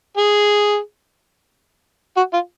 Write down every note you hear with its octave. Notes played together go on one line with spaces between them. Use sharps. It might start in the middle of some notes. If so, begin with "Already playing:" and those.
G#4
F#4
F4